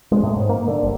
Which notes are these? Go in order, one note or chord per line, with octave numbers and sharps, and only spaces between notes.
G#3
A2
G#2
A#3
D3
G1